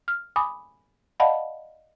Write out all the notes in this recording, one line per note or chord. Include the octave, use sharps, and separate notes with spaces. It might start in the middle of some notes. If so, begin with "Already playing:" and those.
F6
G#5 B5 D6 D#6
D5 D#5 F5 F#5 A5 B5